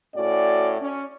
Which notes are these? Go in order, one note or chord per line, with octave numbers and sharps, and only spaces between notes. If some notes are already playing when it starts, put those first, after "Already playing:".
A2 C#4 F#4 D5
C#4